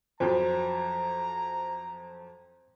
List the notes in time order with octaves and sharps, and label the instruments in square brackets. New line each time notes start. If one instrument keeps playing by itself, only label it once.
[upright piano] F2 F3 F#3 [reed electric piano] C5 [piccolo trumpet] A#5